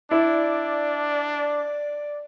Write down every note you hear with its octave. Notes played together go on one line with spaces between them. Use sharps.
D4 E4 D5